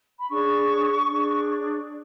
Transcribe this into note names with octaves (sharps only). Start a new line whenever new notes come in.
B5
D4 G#4 C#5 C#6
D4 G#4 C#5